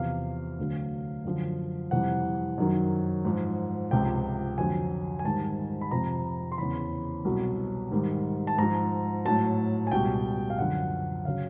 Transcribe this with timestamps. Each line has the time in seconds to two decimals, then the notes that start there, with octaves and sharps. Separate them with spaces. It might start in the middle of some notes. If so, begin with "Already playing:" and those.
Already playing: E2 C3 F3 F5
0.58 D2 D3 F#3
1.24 F#2 D3 F3
1.91 F2 C3 E3 G3 F#5
2.58 F#2 D#3 F#3
3.25 G#2 F3
3.91 C#2 C3 F3 G5
4.58 F2 D3 F#3 G#5
5.19 G#5
5.25 G#2 D#3 G3 A5
5.81 B5
5.91 F2 C3 F3 A#5
6.52 C6
6.58 E2 C#3 E3 B5
7.25 C2 B2 F#3
7.91 G#2 D#3 G3
8.47 A5
8.58 G#2 F3 A#5
9.25 A2 F#3 A5
9.87 G#5
9.92 C#2 B2 G3 G5
10.50 F5
10.59 F#2 D3 F3 F#5
11.25 C#3 F#3 F5